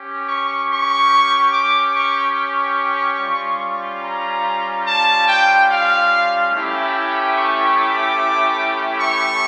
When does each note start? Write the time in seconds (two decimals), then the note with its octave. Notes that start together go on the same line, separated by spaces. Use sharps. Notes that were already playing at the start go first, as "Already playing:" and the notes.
Already playing: C#4 G4
0.28 C#6
0.69 C#6
1.53 D6
1.94 C#6
2.36 C#6
3.19 G3 C#4 F4
4.02 A#5
4.85 A5
5.27 G5
5.69 F5
6.51 A3 C#4 E4 G4
6.92 G5
7.35 C#6
7.76 D6
9.00 C#6